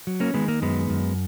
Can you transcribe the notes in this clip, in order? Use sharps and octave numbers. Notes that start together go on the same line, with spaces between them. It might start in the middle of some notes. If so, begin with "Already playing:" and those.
F#3
A#3 C#4
D#3 G#3 B3
A#3
F#2 G#3 B3
F#2